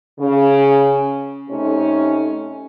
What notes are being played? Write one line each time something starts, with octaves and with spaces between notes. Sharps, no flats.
C#3
C3 A3 C#4 D#4